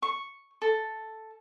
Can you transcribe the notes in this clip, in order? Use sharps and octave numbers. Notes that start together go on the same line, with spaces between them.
C#6
A4